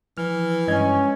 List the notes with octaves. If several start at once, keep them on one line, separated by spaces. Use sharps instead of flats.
E3 F3 F6
G2 G#3 C#4 D#5 G#6